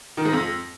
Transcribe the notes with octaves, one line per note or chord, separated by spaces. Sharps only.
D#3
G#2
F2